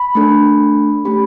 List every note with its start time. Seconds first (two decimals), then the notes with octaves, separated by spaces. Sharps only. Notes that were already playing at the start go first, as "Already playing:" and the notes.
Already playing: B5
0.15 A3 D4 A4
1.05 A3 C#4 G4 B5